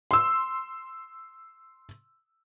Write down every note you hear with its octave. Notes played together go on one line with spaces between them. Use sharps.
C6 E6